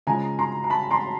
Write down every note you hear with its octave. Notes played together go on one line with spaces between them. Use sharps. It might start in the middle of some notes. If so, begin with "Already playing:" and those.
C#3 F3 G#3 G#5 A#5
A#5 C6
A#5
A5 B5
A#5 C6